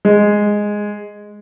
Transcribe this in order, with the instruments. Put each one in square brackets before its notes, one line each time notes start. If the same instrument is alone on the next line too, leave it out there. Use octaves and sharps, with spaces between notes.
[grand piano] G#3